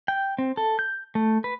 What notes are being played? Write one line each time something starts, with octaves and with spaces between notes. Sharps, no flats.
G5
C4
A4
G6
A3
B4